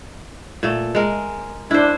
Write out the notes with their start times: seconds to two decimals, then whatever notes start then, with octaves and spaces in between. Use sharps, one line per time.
0.63 A#2 A3
0.95 G#3 A#4
1.71 D4 E4 C5